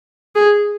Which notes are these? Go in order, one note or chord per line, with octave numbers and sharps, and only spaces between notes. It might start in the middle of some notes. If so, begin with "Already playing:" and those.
G#4